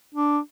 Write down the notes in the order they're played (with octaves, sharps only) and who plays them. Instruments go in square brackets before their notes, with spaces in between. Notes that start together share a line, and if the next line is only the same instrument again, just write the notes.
[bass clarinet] D4